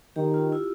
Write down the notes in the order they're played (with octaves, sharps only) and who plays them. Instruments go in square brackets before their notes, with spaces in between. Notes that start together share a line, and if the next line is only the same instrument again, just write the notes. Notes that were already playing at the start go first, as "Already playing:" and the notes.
[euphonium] D#3 [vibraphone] G4
[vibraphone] F4
E4